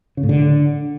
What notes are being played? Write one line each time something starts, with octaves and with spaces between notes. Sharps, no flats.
C#3
A2
D3